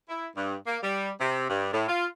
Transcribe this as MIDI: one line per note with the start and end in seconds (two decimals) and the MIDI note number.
0.09 0.27 64
0.36 0.56 43
0.66 0.77 58
0.82 1.10 55
1.20 1.46 48
1.49 1.69 43
1.73 1.85 45
1.88 2.05 65